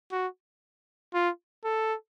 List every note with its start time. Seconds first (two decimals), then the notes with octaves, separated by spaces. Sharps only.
0.12 F#4
1.14 F4
1.64 A4